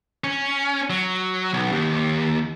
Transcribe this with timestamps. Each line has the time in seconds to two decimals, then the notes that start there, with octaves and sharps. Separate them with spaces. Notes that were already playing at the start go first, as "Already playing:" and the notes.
0.24 C#4
0.90 F#3
1.54 B1
1.72 D#2